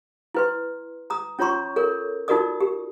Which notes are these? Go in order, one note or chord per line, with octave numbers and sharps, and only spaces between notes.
E4 B4 C6
A#5 D#6
C#4 F4 C#5 A#5 C6 C#6
A4 A#4 C#5
D#4 F4 F#4 A#4 D5 D#6
G4